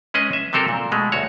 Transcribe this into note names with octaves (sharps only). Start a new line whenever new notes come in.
G#3 C#4 G#4 B4 D#5
E5
C3 F#3 C4 A4 A#4 C5
A#2
B2 G#3 A3
D2 F#4 C#5